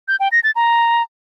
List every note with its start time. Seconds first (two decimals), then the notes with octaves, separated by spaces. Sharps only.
0.08 G6
0.20 G5
0.32 A#6
0.44 A6
0.56 A#5